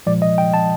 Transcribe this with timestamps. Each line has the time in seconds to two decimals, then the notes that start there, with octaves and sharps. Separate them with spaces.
0.07 A#2 F3 G#3 D5
0.22 D#5
0.38 G5
0.54 A5